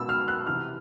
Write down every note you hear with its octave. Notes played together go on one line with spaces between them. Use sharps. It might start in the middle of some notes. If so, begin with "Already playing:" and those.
Already playing: B2 E6
F6
F#6
C3 E3 F6